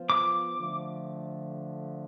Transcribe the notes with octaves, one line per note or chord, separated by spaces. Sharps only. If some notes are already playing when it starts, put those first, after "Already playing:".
Already playing: F3 B3 F4 C5
D6
D3 F3 A3